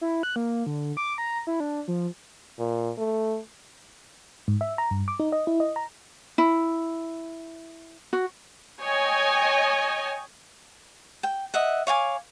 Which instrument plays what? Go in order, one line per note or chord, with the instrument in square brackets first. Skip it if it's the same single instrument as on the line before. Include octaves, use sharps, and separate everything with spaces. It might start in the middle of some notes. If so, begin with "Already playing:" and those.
[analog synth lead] E4
F#6
A#3
D3
D6
A#5
E4
D4
F3
[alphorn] A#2
A3
[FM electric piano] G#2
E5
A#5
G2
D6
D#4
D#5
E4
D#5
A#5
[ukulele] E4
F#4
[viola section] C#5 D#5 G5 G#5
[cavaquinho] G5
D#5 E5 F#5
C#5 F5 G#5 D6